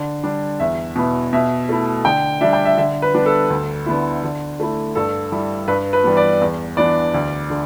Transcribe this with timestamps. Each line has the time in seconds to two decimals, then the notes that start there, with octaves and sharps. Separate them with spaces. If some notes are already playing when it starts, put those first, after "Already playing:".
Already playing: D3
0.23 G3 D4
0.60 E2 E5
0.96 B2 B3 E4
1.33 B2 E5
1.69 A3 E4
2.05 D3 G5
2.41 G3 D4 E5
2.53 G5
2.65 E5
2.78 D3 E5
3.02 B4
3.14 G3 B3 D4
3.26 A4
3.50 D2
3.86 D3 B3 E4
4.23 D3
4.60 A3 E4
4.95 G2 A4
5.32 G3 E4
5.68 G2 B4
5.93 B4
6.04 E3 G3 B3
6.17 D5
6.41 E2
6.77 E3 B3 D4 D5
7.14 D2
7.50 D3